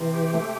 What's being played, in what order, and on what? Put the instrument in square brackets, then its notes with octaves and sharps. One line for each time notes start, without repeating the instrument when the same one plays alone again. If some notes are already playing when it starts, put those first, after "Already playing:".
Already playing: [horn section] C3 [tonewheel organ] E3
[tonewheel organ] G4
A3